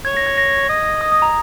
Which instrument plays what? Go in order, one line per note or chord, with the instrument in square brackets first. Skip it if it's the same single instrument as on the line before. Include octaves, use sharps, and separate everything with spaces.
[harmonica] C#5 [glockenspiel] G#6
[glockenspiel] A#6
G#6
A#6
[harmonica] D#5
[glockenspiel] D#6
D#6
A#5